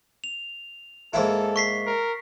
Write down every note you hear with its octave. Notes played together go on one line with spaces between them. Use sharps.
F7
G#2 A#3 E4 A4
C#6 B6 C7
A#4